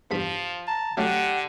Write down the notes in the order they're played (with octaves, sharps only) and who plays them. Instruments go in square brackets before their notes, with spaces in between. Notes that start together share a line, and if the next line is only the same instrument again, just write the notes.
[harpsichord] E2 G2 B5 [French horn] F3
[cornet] A5 [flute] A#5
[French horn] D3 [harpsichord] F#3 A3 C#4 [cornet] G4 [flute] F#5